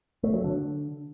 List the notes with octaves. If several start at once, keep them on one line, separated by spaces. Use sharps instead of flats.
A3
F#3
D3